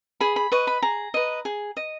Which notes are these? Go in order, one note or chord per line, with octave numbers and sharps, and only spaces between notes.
G#4 B5
B5
B4 D#5 C#6
B5
G#4 A#5
B4 D#5
G#4
D#5